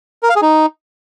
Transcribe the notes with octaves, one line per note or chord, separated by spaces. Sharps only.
A#4
F5
G#4
D#4